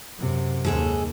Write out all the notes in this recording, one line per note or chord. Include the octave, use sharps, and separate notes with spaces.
F#2 C3
D#2 G#2 G#4 A4